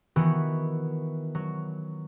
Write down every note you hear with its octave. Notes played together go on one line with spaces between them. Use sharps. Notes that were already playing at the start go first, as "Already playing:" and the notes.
D#3 E3 B3 F#4
F#3